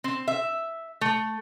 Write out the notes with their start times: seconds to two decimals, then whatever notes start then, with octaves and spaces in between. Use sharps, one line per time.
0.04 C4
0.28 E5
1.01 A3